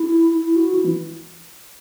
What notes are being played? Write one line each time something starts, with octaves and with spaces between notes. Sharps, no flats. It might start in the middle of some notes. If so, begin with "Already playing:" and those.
Already playing: E4
E4
F#4
E4
E3